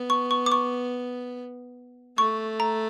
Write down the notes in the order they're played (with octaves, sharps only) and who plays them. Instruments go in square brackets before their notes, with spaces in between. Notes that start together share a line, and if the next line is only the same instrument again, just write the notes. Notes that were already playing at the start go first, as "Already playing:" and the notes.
Already playing: [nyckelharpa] B3
[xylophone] C#6
C#6
D6
C#6
[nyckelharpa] A3 [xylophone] C#6
[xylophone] A#5